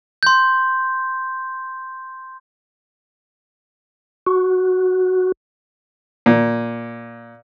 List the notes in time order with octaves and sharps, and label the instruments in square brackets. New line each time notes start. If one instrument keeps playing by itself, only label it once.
[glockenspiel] C6 G6
[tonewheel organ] F#4
[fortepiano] A#2